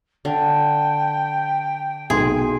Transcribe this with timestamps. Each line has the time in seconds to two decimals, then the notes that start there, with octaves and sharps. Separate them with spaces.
0.25 D3 G5
2.10 B1 G#4 C6